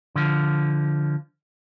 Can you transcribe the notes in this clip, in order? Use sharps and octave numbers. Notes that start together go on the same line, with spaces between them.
D3 F3